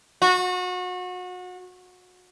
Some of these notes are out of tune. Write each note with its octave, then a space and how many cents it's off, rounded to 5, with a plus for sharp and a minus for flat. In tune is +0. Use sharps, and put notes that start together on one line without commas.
F#4 -30